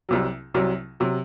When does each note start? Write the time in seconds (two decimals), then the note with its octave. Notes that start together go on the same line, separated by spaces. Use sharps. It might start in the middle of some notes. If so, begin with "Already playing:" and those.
0.09 C2 C3 F#3
0.54 C2 C3 F#3
1.00 C3 F#3